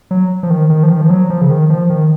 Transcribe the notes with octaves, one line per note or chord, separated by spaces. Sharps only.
F#3
F3
D#3
D#3
F3
D#3
F3
F#3
F3
C#3
D#3
F3
D#3